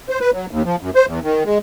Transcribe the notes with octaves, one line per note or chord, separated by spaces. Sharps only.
C5
B4
F#3
D#2
F3
F#2
C5
E2
D#3
G#3